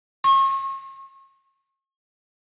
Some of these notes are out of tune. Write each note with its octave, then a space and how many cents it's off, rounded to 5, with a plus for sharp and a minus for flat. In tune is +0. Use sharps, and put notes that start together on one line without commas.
C#6 -40